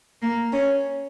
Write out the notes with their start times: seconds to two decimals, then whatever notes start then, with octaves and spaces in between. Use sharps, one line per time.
0.22 A#3
0.52 C#4